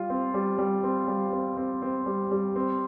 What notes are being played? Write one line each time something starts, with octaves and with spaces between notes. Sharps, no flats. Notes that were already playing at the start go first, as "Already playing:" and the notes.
Already playing: G3 F4
C4
G3
G3
C4
G3
C4
C4
C4
G3
G3
C4